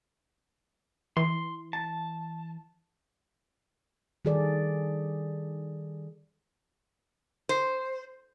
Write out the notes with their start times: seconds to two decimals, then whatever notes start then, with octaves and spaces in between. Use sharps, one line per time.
1.17 E3 C6
1.73 A5
4.25 D#3 G3 G#4 A4 D5
7.49 C5